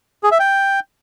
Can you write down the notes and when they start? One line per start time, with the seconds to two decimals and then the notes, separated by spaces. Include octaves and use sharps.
0.23 G#4
0.31 E5
0.40 G5